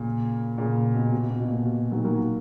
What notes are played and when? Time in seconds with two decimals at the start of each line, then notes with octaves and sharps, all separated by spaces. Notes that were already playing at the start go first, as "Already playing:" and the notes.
Already playing: A#2 C#3
0.58 A#2 C#3
0.94 B2
1.12 B2
1.29 B2
1.40 B2
1.47 A#2
1.65 B2
1.91 D#3 F#3
2.04 F#3 A#3